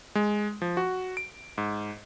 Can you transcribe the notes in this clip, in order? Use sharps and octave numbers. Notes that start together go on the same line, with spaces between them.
G#3
F3
F#4
D7
G#2